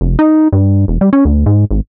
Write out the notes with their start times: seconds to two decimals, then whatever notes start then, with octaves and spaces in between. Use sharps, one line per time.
0.01 F1
0.19 D#4
0.53 G2
0.88 E1
1.01 G3
1.13 C#4
1.25 D2
1.46 G#2
1.71 G#1